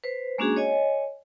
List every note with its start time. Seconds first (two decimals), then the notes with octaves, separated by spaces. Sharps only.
0.04 B4 C5
0.38 G#3 A#3 C#4 D4 F#4 G#4
0.57 C#5 D#5 G#5